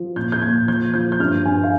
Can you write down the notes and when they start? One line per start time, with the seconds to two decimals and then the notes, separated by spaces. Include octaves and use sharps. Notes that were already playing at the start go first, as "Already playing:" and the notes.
Already playing: F3
0.16 A#2 G6
0.32 G6
0.42 A#2 G#6
0.68 F3 G6
0.93 F3 G6
1.12 G6
1.19 G2 F6
1.45 G2 G#5
1.63 F5